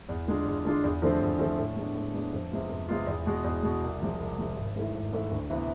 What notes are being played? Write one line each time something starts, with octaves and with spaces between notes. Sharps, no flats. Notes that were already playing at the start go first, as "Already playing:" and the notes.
E2
D3 G#3 D4 F4
E2
D3 G#3 D4 F4
E2
D3 F3 A3 C4
E2
D3 F3 A3 C4
A2
G#3 B3 D4
A2
G#3 B3 D4
F2
C3 G#3 B3 F4
F2
C3 G#3 B3 F4
E2
B2 G#3
E2
B2 G#3
C2
C3 F3 G#3
C2
C3 F3 G#3
G#1
G#2 E3 A3 E4
G#1
G#2 E3 A3 E4
D2
C3 E3 B3